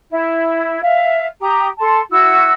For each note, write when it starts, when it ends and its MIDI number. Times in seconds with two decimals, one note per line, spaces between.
0.11 0.80 64
0.82 1.26 76
0.82 1.26 77
1.41 1.68 67
1.41 1.68 82
1.41 1.68 87
1.79 2.00 69
1.79 2.00 81
1.79 2.00 84
2.10 2.54 64
2.10 2.54 66
2.10 2.54 78
2.10 2.54 88